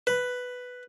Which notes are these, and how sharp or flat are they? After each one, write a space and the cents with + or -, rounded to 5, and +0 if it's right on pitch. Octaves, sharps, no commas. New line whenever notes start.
B4 +5